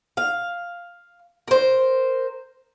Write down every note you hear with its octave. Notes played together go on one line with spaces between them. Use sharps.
F5
A#4 C5